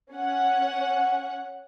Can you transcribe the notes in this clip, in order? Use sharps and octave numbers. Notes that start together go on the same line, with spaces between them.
C#4 F#5